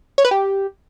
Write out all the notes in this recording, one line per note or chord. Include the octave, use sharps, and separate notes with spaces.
C#5
B4
G4